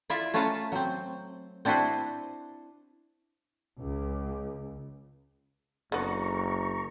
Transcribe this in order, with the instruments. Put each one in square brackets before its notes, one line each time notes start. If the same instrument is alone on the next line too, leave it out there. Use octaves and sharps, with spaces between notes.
[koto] E4 F4 D5 E5
A3 C#4 F4 B4 A5 A#5
F#3 C4
C4 D4 E4 F#4 B4 C5
[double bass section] C#2
[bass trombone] F#1 [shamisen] D3 B3 [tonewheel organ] A#5 C#6